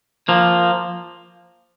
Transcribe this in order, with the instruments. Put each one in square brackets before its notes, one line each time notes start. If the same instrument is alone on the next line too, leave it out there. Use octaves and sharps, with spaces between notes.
[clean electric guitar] F3 A#3